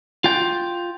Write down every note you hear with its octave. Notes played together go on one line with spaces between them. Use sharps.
F4 G5